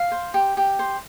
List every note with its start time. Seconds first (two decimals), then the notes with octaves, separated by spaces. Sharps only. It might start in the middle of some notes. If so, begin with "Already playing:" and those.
Already playing: F5
0.11 C5
0.34 G4
0.57 G4
0.79 C5